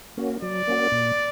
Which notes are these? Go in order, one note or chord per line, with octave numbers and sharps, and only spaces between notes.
A#3 C#4 F#4
F#3 D5
A#3 C#4 F#4
A#2